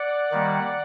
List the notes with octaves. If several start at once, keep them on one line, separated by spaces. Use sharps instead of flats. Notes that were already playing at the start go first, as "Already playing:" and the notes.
Already playing: D5 F#5
D#3 G3 A#3